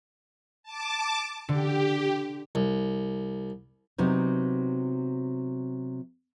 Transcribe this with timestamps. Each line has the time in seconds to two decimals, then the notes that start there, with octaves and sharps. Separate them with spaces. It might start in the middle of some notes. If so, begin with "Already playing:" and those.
0.63 A5 D6
1.49 D3 G4
2.55 C2
3.98 C3 F#3 B3 D#4